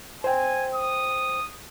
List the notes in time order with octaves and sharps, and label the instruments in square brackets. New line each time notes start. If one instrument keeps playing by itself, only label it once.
[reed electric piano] C5 G5 [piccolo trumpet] G#5
[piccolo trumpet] D#6